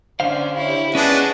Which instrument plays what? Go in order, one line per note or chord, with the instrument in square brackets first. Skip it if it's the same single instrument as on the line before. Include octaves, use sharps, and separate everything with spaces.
[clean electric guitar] D3 C5 F5 [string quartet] C#4 D4
[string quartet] E4 G4 C#5
[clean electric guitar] C#4 [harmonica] D4 G#4 B4 [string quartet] D#5 F#5 A5